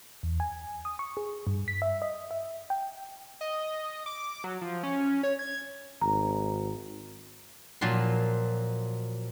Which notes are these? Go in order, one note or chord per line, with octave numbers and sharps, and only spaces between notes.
E2
G#5
D#6
C#6
G#4
G2
B6
E5
D#5
E5
G5
D#5
D6
F#3
F3
C#4
C#5
G#6
G#1 A#5
A#2 F3 F#3 C6